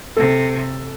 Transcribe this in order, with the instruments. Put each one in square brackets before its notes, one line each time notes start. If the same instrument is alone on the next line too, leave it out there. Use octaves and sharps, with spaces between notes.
[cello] C3 [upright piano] A4